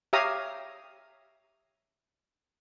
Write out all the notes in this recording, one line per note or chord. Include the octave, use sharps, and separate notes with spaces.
G4 C#5 E5 F5 A#5 D#6